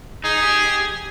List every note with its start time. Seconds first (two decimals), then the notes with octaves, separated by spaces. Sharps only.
0.24 D#4 G#4
0.43 G4